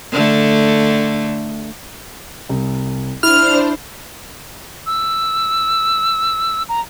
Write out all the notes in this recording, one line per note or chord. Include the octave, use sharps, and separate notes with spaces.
D3 A3
C2
D4 E4 C5 F6
E6
A#5